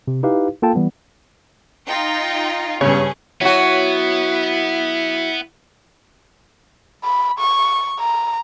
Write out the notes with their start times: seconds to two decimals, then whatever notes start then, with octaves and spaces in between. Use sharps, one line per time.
0.08 C3
0.23 D#4 E4 G4 B4 F5
0.62 A#3 F4 A4 F5 G5 A5
0.75 E3 G3 B3
1.87 D#4 F4 G5
2.81 G2 C#3 C#4 G#4 C#5
3.41 F#3 B3 E4 F#4
7.04 B5
7.39 C#6
8.00 A#5